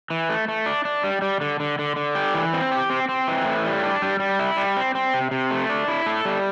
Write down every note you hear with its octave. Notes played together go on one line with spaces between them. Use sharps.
E3
A3
A3
D4
D4
G3
G3
D3
D3
D3
D3
G4
E3
C4
G4
C4
C4
E3
A2
G3
D4
G3
G3
E4
G3
C4
C4
C3
C3
A3
D4
E4
A4
G3